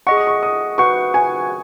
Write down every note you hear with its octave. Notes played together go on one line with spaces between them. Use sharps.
G#4 D#5 F#5 C#6
D#6
C#6
D#6
F#4 B4 F#5 C#6
G#5